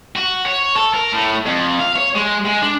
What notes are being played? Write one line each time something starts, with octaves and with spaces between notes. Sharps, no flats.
F#4
C#5
A4
A#4
A2
F2
F5
C#5
G#3
G#3
D4